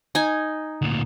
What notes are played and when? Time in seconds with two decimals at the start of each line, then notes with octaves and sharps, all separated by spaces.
0.15 D#4 G#5
0.82 D2 A#2